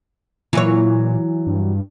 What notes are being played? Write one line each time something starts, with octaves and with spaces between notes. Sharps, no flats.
A#2 E3 F#3 C#5
G2